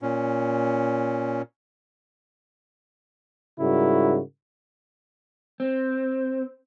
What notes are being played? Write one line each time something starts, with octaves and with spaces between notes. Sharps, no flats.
A#2 C#4
G#2 C#3 G3 E4 F#4 A#4
C4